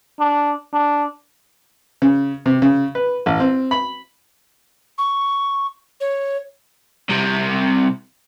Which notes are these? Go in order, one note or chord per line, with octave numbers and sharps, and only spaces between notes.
D4
D4
C#3
C3
C#3
B4
A1
C4
B5
C#6
C#5
C2 C3